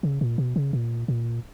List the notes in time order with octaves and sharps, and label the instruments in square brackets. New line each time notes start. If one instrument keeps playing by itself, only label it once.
[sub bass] C#3
A#2
B2
C#3
A#2
A#2